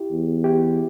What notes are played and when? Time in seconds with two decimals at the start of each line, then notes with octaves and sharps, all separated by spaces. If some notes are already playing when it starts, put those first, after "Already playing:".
Already playing: E4 G4
0.12 E2
0.44 E4 G4